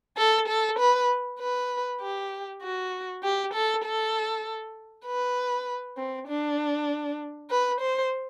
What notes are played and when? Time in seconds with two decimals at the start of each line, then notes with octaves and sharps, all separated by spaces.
0.17 A4
0.48 A4
0.79 B4
1.39 B4
2.01 G4
2.62 F#4
3.23 G4
3.53 A4
3.84 A4
5.05 B4
5.97 C4
6.28 D4
7.50 B4
7.80 C5